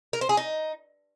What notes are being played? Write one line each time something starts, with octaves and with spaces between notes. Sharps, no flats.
A#4
C5
G#4
D#4